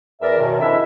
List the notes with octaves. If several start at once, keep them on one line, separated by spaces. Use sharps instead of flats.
E2 A#4 D5 E5
F#2 B2 D#3
F2 G#2 D4 E4 E5